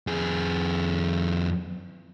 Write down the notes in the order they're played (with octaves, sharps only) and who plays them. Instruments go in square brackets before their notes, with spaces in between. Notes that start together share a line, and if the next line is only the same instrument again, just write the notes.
[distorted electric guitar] F2 G#4